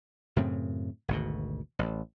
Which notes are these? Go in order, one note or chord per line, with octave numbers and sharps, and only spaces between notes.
F#2 A2 C#3 C4
G#1 D2 B2
A1